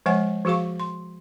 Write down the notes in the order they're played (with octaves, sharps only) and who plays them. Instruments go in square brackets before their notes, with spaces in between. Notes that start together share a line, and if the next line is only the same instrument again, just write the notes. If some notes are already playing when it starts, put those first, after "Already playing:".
[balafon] F3 G#3 C#5 F#5 G#5
F3 F#4 G#4 F5 C#6
C6